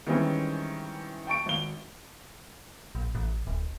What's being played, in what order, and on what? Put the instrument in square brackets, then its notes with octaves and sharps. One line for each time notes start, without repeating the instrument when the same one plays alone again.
[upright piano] D#3 E3 G3 G#3 C4 C#4
G5 A5 C#6 D7
G#1 G7
[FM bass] A#1
A1
D1